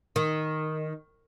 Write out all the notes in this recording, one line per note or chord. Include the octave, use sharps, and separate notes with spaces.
D#3